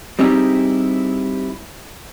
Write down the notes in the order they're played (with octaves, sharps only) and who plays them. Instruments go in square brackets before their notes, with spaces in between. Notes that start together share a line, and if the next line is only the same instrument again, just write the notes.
[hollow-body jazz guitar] G3 C4 D#4 E4 G4 G#4